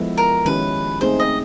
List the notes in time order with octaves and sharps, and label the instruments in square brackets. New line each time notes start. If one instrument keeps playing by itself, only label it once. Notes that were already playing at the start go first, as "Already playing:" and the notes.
Already playing: [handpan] F3 G#3 B3 E4 A4
[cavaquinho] A#4
[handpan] D#3 G#3 C#4 E4 G4 [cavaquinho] B4
[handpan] A3 C4 D#4 G#4 [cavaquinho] C5
[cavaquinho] D#5